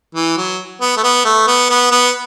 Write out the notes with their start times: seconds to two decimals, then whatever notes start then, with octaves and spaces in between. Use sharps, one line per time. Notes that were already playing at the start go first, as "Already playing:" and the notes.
0.15 E3
0.37 F#3
0.81 B3
0.97 A3
1.03 B3
1.25 A3
1.47 B3
1.70 B3
1.92 B3